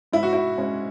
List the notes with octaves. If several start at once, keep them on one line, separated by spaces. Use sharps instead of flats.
G#2 E4
F#4
E4
G#3 C#4